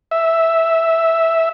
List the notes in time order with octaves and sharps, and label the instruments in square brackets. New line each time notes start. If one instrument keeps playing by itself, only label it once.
[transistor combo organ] E5